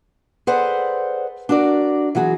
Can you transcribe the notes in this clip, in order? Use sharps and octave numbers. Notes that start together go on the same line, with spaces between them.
G#4 A4 B4 C5 D5 F#5
D4 F#4 A#4 D5
E3 F#3 F#4 G#4